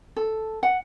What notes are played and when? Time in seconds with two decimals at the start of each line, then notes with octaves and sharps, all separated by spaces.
0.16 A4
0.63 F#5